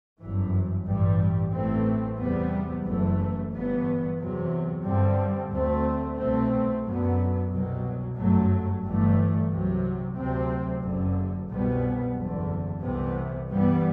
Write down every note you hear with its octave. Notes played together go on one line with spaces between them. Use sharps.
G1 F#2 E3
A1 G2 E3 G3
A1 A2 E3 A3 C4
E2 C3 G3 B3
F#1 F#2 E3 A3
G1 G2 E3 B3
E2 C3 F#3
G2 D3 G3 C4
D2 D3 A3 C4
C2 B2 A3 C4
F#2 D3 F#3 B3
C2 B2 F#3
G1 F#2 F#3 A3
G1 G2 E3 A3
C2 C3 F#3
D2 C3 F#3 C4
F#1 F#2 D3
C2 B2 G3 B3
F#1 E2 D3
C2 C3 E3 B3
G2 E3 G3 B3